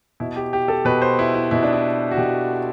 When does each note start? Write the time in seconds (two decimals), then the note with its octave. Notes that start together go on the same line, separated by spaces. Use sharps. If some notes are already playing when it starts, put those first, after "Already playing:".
0.20 B2 E4
0.36 G4
0.53 G4
0.68 A4
0.85 B2 B4
1.02 C5
1.19 E4
1.34 E4
1.51 B2 E4
1.63 D4
1.73 E4
2.11 F#4
2.17 B2 G4